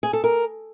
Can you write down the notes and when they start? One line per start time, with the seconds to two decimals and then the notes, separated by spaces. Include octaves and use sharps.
0.03 G#4
0.13 A4
0.24 A#4